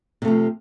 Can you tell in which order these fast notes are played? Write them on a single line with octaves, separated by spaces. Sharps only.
C3 A3 F3